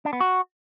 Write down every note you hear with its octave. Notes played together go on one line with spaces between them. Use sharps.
D4
B3
F#4